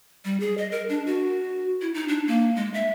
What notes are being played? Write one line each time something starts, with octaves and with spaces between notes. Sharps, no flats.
G3
G#4
D#5
A#4
D4
F#4
E4
D#4
D4
A#3
G#3
E5